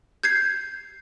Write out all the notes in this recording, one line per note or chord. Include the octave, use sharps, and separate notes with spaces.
G6 G#6 C7